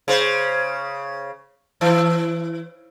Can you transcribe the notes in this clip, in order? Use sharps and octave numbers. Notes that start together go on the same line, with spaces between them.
C#3 C5
E3